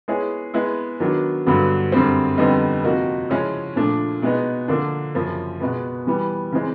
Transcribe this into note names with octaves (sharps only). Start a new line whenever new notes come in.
G#3 B3 E4 G#4 C#5
G#3 B3 E4
D#3 F#3 B3 D4
G2 D3 F#3 B3
F#2 D3 G3 C4
F2 D3 G3 B3 D#4
C3 F3 A#3 D#4 F#4
C#3 F3 G#3 C#4 E4
A#2 F3 A3 D4
B2 G#3 B3 D#4
D3 F3 A#3 D4
F#2 C#3 F3 A#3
B2 G#3 B3
E3 G3 B3
C#3 E3 G#3 C4